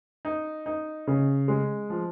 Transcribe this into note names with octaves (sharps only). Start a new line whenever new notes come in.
D#4
D#4
C#3
G#3
F3